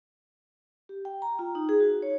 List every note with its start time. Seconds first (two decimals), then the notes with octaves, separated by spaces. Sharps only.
0.89 G4
1.05 G5
1.22 A#5
1.39 F4
1.55 D#4
1.69 G#4
1.80 F#4
2.02 C#5